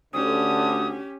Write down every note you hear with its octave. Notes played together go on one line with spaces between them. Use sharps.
D2 D3 C#4 G4 D#6